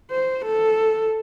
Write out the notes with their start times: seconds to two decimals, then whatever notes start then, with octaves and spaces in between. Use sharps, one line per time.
0.11 C5
0.46 A4